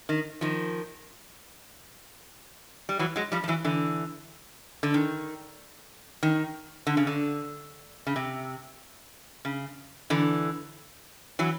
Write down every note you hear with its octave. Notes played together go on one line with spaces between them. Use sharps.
D#3
D#3 F3
G3
E3 F#3
F#3 G#3
F3 G3
F3
E3 F#3
D3 E3
D3
D#3
D#3
D3
C#3
D3
C#3
C3
C#3
D3 E3
E3 F#3